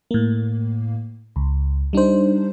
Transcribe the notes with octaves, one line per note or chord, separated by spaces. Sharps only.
A2 A#3
C#2
G3 D4 D#4 C5